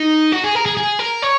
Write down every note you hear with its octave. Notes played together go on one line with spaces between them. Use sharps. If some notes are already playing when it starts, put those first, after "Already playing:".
Already playing: D#4
F#4
G#4
A#4
G#4
G#4
A#4
C#5